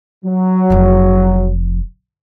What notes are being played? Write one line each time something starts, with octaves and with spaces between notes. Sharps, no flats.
F#3
F1 F3